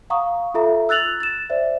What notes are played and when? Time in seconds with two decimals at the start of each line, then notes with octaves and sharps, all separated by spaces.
0.10 F5 F#5 A#5 C#6 D#6
0.54 F4 A4 E5 A#5
0.89 E6 F#6 A6 F7 F#7
1.20 A6 E7
1.50 C5 D5 E5